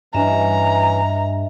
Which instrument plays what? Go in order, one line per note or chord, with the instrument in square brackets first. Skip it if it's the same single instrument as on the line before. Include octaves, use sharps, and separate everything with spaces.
[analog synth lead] G2 [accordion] E3 C#4 [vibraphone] D#5 E5 [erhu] A#5